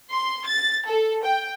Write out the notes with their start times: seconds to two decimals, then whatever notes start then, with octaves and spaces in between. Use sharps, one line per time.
0.12 C6
0.44 A6
0.86 A4
1.22 G5